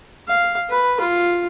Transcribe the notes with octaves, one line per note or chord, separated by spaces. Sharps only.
F5
B4
F4